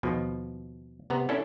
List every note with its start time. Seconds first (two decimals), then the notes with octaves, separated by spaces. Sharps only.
0.03 D#2 B2 F3
1.10 C3 B3 A#5
1.29 C#4 D4 E4 A4